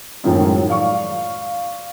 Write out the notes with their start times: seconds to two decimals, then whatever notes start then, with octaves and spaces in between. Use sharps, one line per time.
0.24 F#2 A2 D#3 F3 F#3 G#3
0.68 D5 F5 C#6